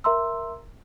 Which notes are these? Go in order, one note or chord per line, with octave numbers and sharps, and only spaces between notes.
A#4 E5 A#5 C6 E6